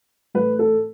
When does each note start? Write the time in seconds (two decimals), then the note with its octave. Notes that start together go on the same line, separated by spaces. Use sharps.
0.34 A2 E3 A3 B4
0.59 A4